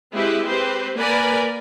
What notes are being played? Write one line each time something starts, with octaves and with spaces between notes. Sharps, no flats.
G#3 C4 E4 G4 B4
C4 G4 B4 C5
A#3 A#4 B4 D5 G#5 B5